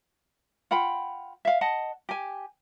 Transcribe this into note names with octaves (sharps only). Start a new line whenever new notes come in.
F4 F#5 G5 B5
E5 F5
D#5 F#5 A5
G4 G#5